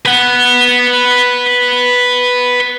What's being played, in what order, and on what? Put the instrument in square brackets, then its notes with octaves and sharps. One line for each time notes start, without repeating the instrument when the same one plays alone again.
[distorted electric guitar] B4 F#5